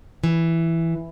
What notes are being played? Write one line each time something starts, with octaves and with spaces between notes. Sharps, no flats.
E3